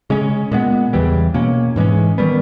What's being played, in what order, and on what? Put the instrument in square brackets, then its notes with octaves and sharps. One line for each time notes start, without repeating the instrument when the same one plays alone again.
[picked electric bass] C#3 G#3 C#4
A#2 G#3 B3
E2 C#3 E3 G3
B2 A#3 C#4
G#2 E3 G#3 C#4
D#3 G3 B3